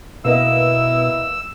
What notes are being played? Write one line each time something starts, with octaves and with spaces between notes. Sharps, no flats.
B2 A#3 B3 E4 D#5 E6